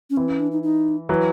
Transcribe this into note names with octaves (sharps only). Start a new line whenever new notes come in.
C#4
E3 C4
C#4
D4
D#4
D#4
E3 F#3